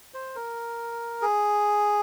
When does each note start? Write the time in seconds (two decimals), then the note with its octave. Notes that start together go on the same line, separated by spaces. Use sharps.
0.14 C5
0.35 A#4
1.22 G#4